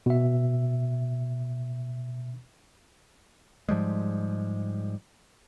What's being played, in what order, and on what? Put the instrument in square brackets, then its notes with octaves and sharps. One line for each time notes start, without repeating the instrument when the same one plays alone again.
[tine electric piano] B2 E5
[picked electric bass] G#2 F3 G3 G#3